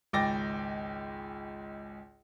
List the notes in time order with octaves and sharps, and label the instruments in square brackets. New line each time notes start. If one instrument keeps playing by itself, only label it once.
[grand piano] G#1 C#2 G5 D6 A6 A#6